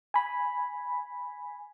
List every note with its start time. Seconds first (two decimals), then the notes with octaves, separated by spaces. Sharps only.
0.14 G#5 B5